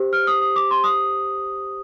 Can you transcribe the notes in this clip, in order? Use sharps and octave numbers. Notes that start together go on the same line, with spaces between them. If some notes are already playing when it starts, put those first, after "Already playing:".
Already playing: G4 C5
F6
D#6
D#6
D6
C6
D#6